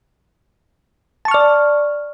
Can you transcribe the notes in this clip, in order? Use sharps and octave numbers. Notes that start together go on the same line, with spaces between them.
D5 A5 C#6 F6